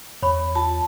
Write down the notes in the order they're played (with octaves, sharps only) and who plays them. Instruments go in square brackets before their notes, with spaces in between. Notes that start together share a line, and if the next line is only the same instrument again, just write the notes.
[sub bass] E2 [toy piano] C#5 B5 C#6
[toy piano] F4 [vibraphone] A5